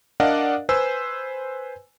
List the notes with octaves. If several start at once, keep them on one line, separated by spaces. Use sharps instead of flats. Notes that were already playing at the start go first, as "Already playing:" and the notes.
D4 A#4 D5 D#5 F5 F#5
B4 C5 G#5 E6